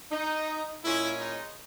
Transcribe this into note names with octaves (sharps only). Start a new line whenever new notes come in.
D#4
A#2 G#3 C#4 E4
D#4